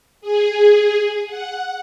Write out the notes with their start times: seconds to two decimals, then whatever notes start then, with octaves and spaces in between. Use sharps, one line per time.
0.21 G#4
1.27 F#5